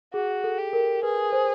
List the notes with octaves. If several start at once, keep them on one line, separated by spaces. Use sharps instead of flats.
F#4 G#4
A4
G4
A#4
G#4 B4
C5